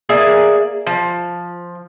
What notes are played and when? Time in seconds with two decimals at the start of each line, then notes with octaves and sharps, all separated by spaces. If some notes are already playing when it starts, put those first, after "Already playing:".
0.09 A#3 G#4 D5 E5
0.87 F3